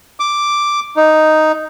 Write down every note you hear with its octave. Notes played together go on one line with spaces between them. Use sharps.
D6
D#4